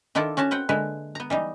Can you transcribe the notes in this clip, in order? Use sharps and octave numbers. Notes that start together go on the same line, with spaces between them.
D#3 D4 E4 F4 A4 D5
C#4 F#4 C#5 A5
C4 B4 F#5 G5
D3 G#3 A#3 B4 E5
B3 A#5
E3 G3 D#4